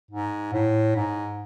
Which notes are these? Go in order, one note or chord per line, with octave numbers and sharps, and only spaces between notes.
G#2
A2
G#2